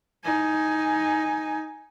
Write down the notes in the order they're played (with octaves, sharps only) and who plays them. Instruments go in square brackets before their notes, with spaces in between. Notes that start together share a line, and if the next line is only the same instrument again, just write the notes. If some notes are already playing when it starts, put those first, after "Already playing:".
[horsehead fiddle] D#4 G#5